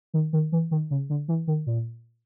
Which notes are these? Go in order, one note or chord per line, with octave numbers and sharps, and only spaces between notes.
D#3
D#3
E3
D#3
C#3
D3
E3
D#3
A#2